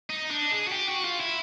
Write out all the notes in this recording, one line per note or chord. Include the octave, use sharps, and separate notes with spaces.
D#4
D4
G#4
F#4
G4
F#4
F4
E4